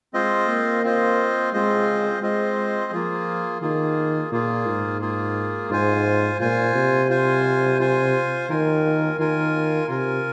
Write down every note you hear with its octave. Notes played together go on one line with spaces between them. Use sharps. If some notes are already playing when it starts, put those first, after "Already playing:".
G#3 C4 F4 C5 D#5
A#3
C4 F4 C5 D#5
G#3 C4 F4 C5 D#5
G#3 C4 F4 C5 D#5
F3 A#3 F4 G#4
D#3 A#3 F4 G#4
A#2 A#3 F4 G#4
G#2
A#3 F4 G#4
G#2 F4 C5 G#5
A#2 F4 C5 G#5
C3
F4 C5 G#5
F4 C5 G#5
D#3 F4 A#4 G#5
D#3 F4 A#4 G#5
C3 F4 A#4 G#5